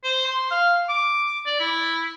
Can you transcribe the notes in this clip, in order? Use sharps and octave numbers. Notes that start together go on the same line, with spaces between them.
C5
C6
F5
D6
D5
E4